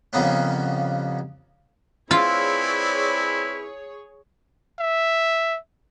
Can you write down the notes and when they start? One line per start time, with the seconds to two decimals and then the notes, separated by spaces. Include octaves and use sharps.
0.13 F2 C#3 G3 A#3 B3 C#4
2.11 C4 E4 F4 G#4 B4 C#5 D5
4.79 E5